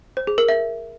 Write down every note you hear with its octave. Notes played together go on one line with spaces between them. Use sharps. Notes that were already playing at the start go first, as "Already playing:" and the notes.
C5
G#4
A#4
E5